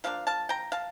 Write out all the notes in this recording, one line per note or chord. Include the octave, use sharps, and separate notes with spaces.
F3 A#3 D4 F5
F5 A5
G5 A#5
F5 A5